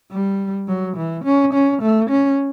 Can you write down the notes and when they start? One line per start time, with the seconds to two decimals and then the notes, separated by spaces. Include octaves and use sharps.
0.12 G3
0.68 F#3
0.97 E3
1.25 C#4
1.54 C#4
1.82 A3
2.10 C#4